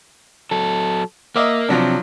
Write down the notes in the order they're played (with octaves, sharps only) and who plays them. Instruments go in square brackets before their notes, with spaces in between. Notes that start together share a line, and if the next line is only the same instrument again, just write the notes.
[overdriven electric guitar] F#3 A4
[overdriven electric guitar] A#3 [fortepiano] D#5 E5 D6
[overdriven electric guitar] C3 [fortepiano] F3 F#3 D4